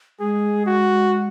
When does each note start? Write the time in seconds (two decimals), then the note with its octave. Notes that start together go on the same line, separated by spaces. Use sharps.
0.20 G#3 G#4
0.66 F#4